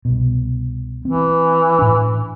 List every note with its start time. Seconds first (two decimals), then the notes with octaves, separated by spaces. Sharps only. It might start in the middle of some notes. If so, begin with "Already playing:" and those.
0.05 C2 B2
1.05 E3 C4
1.79 A2 D4